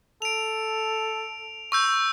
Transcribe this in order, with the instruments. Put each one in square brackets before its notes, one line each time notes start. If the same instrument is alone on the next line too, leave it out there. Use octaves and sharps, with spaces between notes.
[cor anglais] A4 [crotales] D7 F7
[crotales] C#6 E6 G6